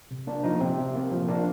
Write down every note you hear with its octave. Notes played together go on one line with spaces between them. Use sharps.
C3
A#3 D4
F3 D#4
C3 C4
C3
A#3
F3
A#3 D4